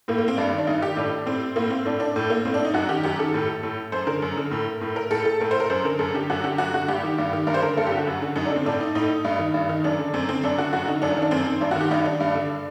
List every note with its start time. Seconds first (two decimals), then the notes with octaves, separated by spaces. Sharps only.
0.08 A2 A#3
0.18 A#3
0.28 C4
0.37 G2 D4
0.53 D#3
0.58 D4
0.67 G2 D#4
0.82 D#3 G4
0.97 A2 D4
1.26 A2 C4
1.56 A2 A#3
1.70 C4
1.85 A2 D4
2.00 D4
2.16 A2
2.30 A#3
2.45 A2 C4
2.54 D4
2.65 D#4
2.74 F#2 F#4
2.89 D#3 G4
3.03 F#2 G4
3.19 D#3 A4
3.34 A2
3.63 A2
3.92 F#2 C5
4.07 D3 A#4
4.22 F#2
4.37 D3
4.51 A2
4.81 A2
4.96 A#4
5.11 A2 A4
5.25 A4
5.40 A2 A#4
5.51 C5
5.60 A#4
5.70 F#2 C5
5.85 D3 A#4
5.99 F#2 A4
6.14 D3 G4
6.30 F#2 F#4
6.44 D3 G4
6.58 F#2 F#4
6.73 D3 F#4
6.88 G2 G4
7.03 D#3
7.18 G2
7.33 D#3
7.47 G2 A#4
7.54 C5
7.62 D3 A#4
7.77 G2 A4
7.87 G4
7.92 D3
7.97 F#4
8.07 F#2
8.22 D3
8.36 F#2 D#4
8.46 D4
8.51 D3 C4
8.65 A2 D4
8.80 D#4
8.95 A2 D#4
9.25 G2
9.39 D#3
9.54 G2
9.69 D#3
9.84 F#2 D4
9.99 D3
10.14 F#2 C4
10.29 D3 C4
10.44 F#2 D4
10.58 D3 F#4
10.73 F#2 F#4
10.87 D3 D#4
11.02 F#2 D4
11.12 D4
11.16 D#3
11.22 D4
11.31 F#2 C4
11.46 D#3
11.61 G2 D4
11.71 D#3 F#4
11.81 G4
11.91 G2 D#4
12.05 D#3 D4
12.20 G2
12.35 D3